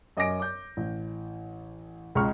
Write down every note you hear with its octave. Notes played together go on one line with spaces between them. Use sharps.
F#2 D#5 G#5 D6 A#6 D7
D6 G6
A1
C#2 G#3 A#5 C#6 F6